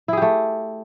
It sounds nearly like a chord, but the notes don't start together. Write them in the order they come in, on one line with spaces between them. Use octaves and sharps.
E4 G#4 G4 A3